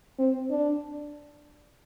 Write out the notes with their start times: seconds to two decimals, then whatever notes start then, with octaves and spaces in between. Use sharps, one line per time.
0.19 C4
0.51 D4